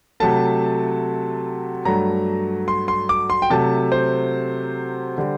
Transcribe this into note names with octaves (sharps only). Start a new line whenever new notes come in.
C3 F#3 A3 A5
G2 F#3 A3 A#5
C6
C6
D6
C6
G5
C3 F#3 A3 A5
C5
D3 G3